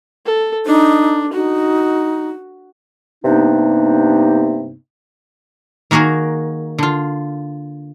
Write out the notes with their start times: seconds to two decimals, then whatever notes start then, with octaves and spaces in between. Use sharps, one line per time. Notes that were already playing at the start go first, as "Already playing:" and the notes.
0.26 A4
0.66 D4 D#4
1.33 D#4 F#4
3.24 G2 C3 A#3 B3 D4 D#4
5.91 D#3 A#3 F#4 G#4 A#4
6.78 D3 F4